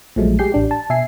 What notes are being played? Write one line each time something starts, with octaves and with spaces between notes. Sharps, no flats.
A#1 A#2 F3 F#3 G#3 A3
G#3 G4 G#4 G6 C7
A1 D4 G4
A5
B2 E5 G#5 C7